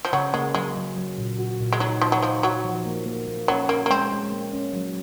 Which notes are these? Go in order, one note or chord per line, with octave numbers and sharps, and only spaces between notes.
F3
C#3 F#3
G#3 A#3
F#3 G#3
F#3
F#3
A#2
F#4
A#2
G#3
F#3 D#4
F3 D#4
F#3
F3 D#4
F#3 F#4
F3
A#3
A#3
A#3
F#3 C#4
A#3 C#4
A#3
G#3 C4
G#3
A#3
C#4
F#3